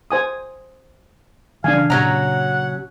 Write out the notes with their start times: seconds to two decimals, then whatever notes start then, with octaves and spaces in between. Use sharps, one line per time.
0.11 C5 G#5 D#6
1.64 C#3 E3 D4 F5 G#5
1.90 A#2 C#3 F#3 C#4 F#5 A#5